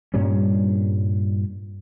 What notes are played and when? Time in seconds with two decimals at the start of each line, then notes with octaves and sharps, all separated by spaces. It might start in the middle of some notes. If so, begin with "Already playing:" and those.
0.14 G2 A#2 G3 C#4